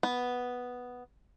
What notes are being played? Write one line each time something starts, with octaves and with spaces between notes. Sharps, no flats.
B3